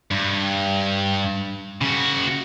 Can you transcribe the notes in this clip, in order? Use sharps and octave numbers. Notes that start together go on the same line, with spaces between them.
G2
C#3 F#4